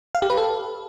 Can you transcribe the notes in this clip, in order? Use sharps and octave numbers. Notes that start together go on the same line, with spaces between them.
F5
G4
B4
A4